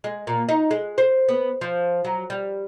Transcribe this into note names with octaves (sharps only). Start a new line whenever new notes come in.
G#3
A#2
D#4
G#3
C5
B3
F3
F#3
G3